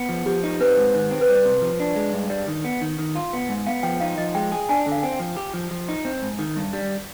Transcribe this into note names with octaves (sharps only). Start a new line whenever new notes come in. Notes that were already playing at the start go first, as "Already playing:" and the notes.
Already playing: B3
F3
F3 G4
D#4
C4 B4
G#2
D#3 C5
C4
B4
G3 C5
C3
F3
D4
G#3
G2
G3 D5
D#3
B3
D#3
D#3
F4
B3
G#2
B3 F5
F3 G5
D#4 F5
F3 D#5
G#3 G5
G#4
D4 G#5
D3
F5
C4 G5
F3
G4
F3
F3
D#4
C4
G#2
D#3
G2
G3